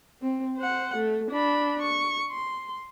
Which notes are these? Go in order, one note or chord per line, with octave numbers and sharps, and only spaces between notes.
C4
C5 F#5
A3
D4 B5
C#6
C6